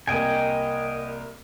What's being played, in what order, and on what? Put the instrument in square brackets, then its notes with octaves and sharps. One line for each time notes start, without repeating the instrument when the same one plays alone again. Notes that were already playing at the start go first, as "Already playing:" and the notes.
[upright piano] C2 A#3 [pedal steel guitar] D#5 G5 G#5